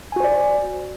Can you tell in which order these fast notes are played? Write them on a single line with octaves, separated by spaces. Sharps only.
G#5 F#4 C5 D5